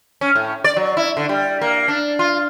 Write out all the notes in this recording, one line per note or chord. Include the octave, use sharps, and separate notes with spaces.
C#4
A2
D5
F#3
E4
D3
G3
A#3
D4
F4